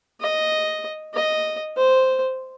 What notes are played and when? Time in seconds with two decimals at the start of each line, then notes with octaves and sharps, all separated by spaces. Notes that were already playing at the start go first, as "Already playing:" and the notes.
0.21 D#5
1.14 D#5
1.77 C5